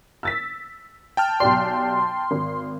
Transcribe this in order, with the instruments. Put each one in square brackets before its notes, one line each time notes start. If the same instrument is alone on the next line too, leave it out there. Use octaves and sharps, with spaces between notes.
[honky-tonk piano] E6 A6 B6
[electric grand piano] G5 A5 F6
[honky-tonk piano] B1 G4 D5 [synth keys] C6
[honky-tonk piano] G#1